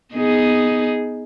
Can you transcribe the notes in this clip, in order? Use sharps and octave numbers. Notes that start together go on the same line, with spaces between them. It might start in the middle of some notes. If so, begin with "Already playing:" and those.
B3 D#4 G#4